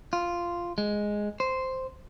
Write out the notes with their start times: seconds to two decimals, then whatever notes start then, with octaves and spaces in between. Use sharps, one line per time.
0.13 F4
0.78 G#3
1.40 C5